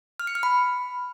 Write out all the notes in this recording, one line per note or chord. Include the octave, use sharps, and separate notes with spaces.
F6
C#7
F6
B5